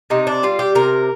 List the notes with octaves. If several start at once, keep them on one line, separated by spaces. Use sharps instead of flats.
C3 D#4
D4
G3 F4
G4
C3 A#4